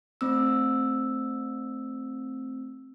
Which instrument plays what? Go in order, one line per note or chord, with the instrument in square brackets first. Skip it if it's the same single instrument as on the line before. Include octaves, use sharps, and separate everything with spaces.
[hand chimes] A3 C4 E6